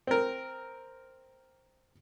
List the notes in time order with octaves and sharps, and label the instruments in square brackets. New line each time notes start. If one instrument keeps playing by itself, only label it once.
[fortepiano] C4 A#4